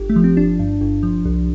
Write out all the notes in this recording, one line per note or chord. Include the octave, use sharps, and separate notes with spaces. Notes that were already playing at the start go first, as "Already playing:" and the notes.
Already playing: G1 G4
A3
F3
C4
G1 D4
G2
G1
F3
C2